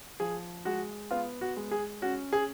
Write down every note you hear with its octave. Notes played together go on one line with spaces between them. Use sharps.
F3 G#4
G#3 F#4
B3 F4
F#4
G#3
G#4
C#4 F#4
G#4